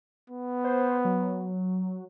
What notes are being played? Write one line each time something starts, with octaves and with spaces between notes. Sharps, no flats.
B3
C5
F#3